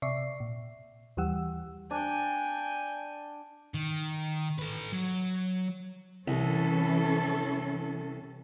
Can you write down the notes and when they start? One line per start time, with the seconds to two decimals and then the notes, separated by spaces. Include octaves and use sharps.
0.02 C3 D5 E5 C#6 C7
0.40 A#2
1.17 D#2 E3 G3 G4 F#5 E6
1.91 D4 G5 G#5
3.74 D#3
4.58 A4 B4
4.92 F#3
6.28 C2 E3 C#4 A4